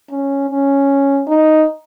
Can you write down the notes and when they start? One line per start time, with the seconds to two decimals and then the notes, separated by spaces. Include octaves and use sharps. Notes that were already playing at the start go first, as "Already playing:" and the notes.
0.10 C#4
0.50 C#4
1.28 D#4